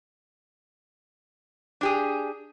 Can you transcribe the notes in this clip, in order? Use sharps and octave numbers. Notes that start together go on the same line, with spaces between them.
D4 G4 G#4